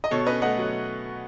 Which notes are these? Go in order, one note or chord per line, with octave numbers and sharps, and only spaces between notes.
D#5
B2 A4 C#5
C#4 B4 D#5
A3 D#5 F#5
F#3